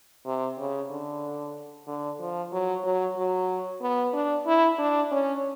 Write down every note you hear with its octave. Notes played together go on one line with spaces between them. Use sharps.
C3
C#3
D3
D3
F3
F#3
F#3
F#3
B3
D4
E4
D4
C#4